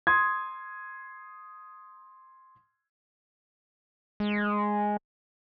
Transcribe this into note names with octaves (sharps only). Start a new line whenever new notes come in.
C6 D#6 G#6
G#3